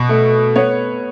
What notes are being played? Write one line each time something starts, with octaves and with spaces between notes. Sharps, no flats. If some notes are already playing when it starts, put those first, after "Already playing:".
Already playing: B2
A3
B3 C#5